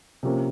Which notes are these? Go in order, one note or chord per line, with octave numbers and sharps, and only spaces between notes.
C3 F3 A#3 C#4